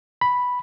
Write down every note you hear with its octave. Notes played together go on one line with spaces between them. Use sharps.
B5